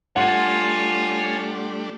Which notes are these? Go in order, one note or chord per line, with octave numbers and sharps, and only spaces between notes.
G3 A3 D4 F4 C#5 F#5 G#5 A5